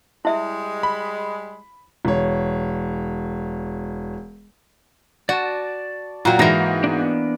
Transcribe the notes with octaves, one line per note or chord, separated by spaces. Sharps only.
G3 G#3 E4 E5
B5
E1 C#5
F#4 D5 A5
A#2 F#3 F4 F#4 G5 A#5
G#2 E3 A#3 A#6 C7
B3 D4